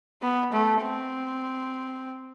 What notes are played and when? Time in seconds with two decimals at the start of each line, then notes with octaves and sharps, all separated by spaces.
0.22 B3
0.53 A3
0.82 C4